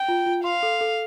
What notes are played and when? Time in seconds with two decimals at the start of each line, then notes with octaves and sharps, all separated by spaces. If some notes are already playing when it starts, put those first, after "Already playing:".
Already playing: G5
0.08 F4
0.26 F4
0.44 F5 C6
0.63 A4
0.81 A4